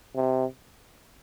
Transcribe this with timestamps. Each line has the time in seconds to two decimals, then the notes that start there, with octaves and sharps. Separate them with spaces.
0.16 C3